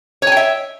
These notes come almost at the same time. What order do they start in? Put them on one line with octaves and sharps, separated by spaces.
C#5 G#5 G5 E5